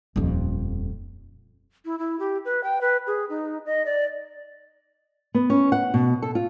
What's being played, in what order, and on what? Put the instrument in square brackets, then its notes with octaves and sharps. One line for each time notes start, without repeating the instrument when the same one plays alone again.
[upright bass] D#1 F2
[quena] E4
E4
G4
B4
G5
B4
G#4
D#4
D#5
D5
[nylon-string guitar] B3
C#4
F#5
B2
A4
F4